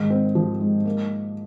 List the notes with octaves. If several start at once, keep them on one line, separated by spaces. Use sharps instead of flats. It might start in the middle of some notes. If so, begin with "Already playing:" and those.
Already playing: G#2 D#3
C4
F3
G#2
A#3